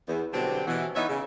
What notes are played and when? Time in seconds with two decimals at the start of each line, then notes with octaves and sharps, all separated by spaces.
0.08 E2
0.34 B2 D3 F#3 G3 C4
0.67 B2 E3
0.95 E3 B3 D#4 C#5 D#5 E5
1.10 C#3